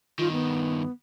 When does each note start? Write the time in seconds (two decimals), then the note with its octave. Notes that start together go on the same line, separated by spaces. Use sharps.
0.19 G2 D#3 F4
0.32 B3